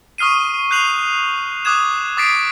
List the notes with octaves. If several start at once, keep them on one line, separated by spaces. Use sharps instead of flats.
C#6 D#6 F6 C7 D#7
F#6 G6 C7 F7 F#7
D6 D#6 F#6 G#6 E7
D6 D#6 A6 B6 C7 D7